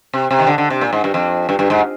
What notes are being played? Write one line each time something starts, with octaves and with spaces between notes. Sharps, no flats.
C3
C3
D#3
D3
D3
C3
A#2
G#2
G2
F2
G2
G2
G#2